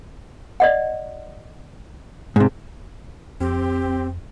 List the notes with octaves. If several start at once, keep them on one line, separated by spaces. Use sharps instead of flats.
D5 D#5 F#5
G#2 C3
F2 C4 G4